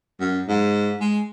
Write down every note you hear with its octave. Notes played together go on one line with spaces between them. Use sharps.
F#2
G#2
G#3